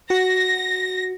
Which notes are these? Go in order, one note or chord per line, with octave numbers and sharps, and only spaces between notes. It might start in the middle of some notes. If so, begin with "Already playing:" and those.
F#4 A#6